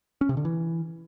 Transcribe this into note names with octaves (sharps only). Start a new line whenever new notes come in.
C#4
C3
D3
E3